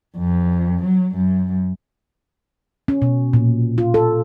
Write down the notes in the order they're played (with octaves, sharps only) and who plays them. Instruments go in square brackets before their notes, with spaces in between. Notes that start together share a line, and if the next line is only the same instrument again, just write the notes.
[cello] F2
F#3
F#2
[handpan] C#4
B2
A#2
F4
A4